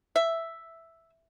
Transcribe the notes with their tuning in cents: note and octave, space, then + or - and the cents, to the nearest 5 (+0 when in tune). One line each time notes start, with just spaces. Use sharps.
E5 +0